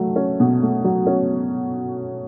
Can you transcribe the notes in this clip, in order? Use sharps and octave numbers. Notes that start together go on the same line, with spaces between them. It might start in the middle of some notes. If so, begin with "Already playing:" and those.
Already playing: F#3 A3
C#4
B2
A3
F#3
C#4